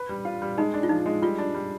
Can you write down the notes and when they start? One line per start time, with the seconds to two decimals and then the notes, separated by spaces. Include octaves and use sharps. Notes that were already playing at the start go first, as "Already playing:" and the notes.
Already playing: B4
0.09 G3
0.25 F4
0.42 G3
0.57 G#3 D#4
0.74 D4
0.83 F4
0.89 F3 D#4
1.06 G#3
1.22 G3 F4
1.38 D4
1.55 G3